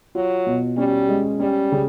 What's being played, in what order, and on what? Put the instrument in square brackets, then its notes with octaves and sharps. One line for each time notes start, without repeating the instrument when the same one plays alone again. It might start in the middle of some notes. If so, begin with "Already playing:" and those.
[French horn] F#3 [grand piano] F4
[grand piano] B2
[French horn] G3 [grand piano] C#4
[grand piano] G#3
[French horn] G3 [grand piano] C#4
[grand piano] C#3